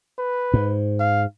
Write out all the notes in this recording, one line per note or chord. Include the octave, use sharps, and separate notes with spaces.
B4
G#2
F5